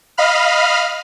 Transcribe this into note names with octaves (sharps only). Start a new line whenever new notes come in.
D#5 F5 B5 F6